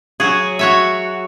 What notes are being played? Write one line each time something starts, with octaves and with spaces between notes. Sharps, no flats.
F#3 F#4 G#4
F#4 C#5 E5